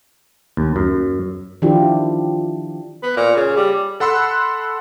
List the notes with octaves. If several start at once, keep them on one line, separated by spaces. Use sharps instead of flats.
D#2
F#2
D#3 F3 D4 E4 F4 G4
B3
A#2
C#3
G3
A4 F#5 B5 C6 E6 F#6